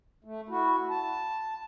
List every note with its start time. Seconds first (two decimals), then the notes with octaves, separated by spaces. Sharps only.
0.25 A3
0.49 E4 F#4
0.90 A5